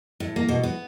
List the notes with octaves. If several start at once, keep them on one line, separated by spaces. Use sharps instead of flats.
A2
A#3
B2
B3